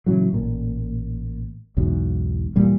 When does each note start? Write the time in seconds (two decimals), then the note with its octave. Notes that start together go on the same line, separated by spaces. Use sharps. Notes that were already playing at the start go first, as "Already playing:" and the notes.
0.06 A#2 C#3 E3 F#3
0.33 A1 A#2
1.77 B1 E2 G#2 B2
2.56 D2 A#2 E3 G3